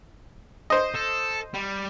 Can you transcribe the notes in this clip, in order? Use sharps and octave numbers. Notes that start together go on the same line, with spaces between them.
C5 D#5
A4
G3